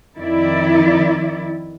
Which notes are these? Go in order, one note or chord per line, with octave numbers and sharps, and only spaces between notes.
F2 D#3 E4 D5